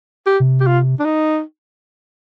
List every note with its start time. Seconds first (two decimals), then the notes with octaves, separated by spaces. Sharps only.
0.26 G4
0.40 C3
0.60 G4
0.67 F4
0.99 D4
1.05 D#4